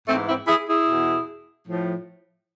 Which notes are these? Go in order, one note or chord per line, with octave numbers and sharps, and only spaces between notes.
G#2 E3 A3 C4
C4 E4
E4 G#4
E4 G#4
E2 B2
A2 F3